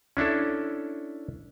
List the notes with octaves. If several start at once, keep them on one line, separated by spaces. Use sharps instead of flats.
C#4 D4 E4 A4